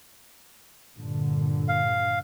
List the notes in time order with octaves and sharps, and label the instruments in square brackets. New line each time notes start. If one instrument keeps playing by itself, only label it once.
[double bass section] G2 A#2 D3
[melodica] F5